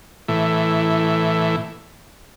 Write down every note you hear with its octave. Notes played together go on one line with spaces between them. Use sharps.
A2 E3